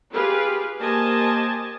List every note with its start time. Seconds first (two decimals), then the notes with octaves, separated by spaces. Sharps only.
0.12 F4 G4 G#4 B4 F5
0.79 A#3 G4 C5 D#5 G#5 A5